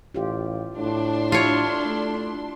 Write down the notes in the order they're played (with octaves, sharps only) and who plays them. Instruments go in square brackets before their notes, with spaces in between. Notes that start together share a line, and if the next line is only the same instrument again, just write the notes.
[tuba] A1 [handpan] F4 G4
[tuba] A2 [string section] D4 C6
[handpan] E4 G4 A4 [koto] F4 C#5
[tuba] A3